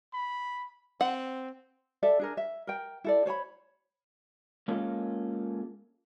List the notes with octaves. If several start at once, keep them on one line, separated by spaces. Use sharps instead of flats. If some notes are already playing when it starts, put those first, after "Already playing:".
B5
C4 F#5
A4 D5 E5
D4 G#4 A#4
E5
A#4 G5
E4 A4 D5
C5 C#5 G#5 B5
G#3 A#3 C#4 F4 A4 A#4